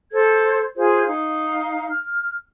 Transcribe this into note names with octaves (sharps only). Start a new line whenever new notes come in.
A4 C5 G#6
F4 G#4 C5
D#4 F5
F6